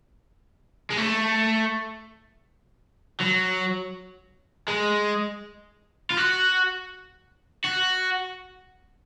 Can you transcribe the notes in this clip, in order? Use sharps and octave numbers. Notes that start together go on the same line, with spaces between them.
G#3
A3
F#3
G#3
F4
F#4
F#4